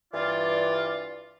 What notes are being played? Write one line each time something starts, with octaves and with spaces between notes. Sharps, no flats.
G2 E3 F4 D5